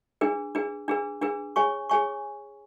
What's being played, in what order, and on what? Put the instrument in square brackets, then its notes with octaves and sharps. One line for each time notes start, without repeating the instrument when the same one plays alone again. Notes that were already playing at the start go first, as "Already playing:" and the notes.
[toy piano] D4 G#4 B4
D4 G#4 B4
D4 G#4 B4
D4 G#4 B4
G#4 C#5 G#5 C#6
G#4 C#5 G#5 C#6